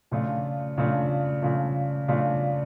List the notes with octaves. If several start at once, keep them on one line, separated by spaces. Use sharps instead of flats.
C#3 F3 A3 D4 F4
C#3 F3 A3 D4 F4
C#3 F3 A3 D4 F4
C#3 F3 A3 D4 F4